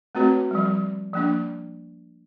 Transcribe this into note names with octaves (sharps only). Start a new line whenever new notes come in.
A3 C4 F#4 B4 C#5
F3 G3
F3 A#3 D4